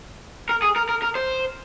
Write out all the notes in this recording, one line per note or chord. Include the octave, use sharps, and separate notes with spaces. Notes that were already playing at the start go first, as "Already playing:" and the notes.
A#4
G#4
A#4
A#4
A#4
C5